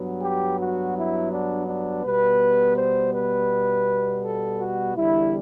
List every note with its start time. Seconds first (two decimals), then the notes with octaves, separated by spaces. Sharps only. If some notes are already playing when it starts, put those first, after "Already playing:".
Already playing: G2 F#3 B3
0.21 G4
0.58 F#4
0.94 E4
1.31 D4
1.67 D4
2.04 B2 G3 B3 B4
2.76 C5
3.13 B4
4.23 A4
4.59 F#4
4.96 E2 D3 G3 E4